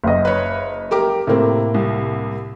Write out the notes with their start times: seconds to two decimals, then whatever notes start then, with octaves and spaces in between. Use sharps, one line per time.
0.04 F#1 D#5
0.25 B4 C#5
0.91 G4 A#4 D6
1.27 A2 C3 A#3 C4
1.74 C2